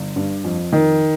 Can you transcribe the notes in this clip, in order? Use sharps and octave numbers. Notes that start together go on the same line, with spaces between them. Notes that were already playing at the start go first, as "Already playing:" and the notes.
Already playing: G1
G2
F2
D#3